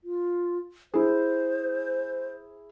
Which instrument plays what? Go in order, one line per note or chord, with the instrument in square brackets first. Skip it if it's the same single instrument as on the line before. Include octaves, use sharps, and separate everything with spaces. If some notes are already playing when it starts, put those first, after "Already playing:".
[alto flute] F4
[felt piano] E4 G#4 [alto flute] C5